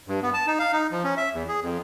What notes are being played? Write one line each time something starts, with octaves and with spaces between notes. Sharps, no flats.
G2
B3
A5
D#4
F5
D#4
F3
C#4
E5
E2
G#4
F2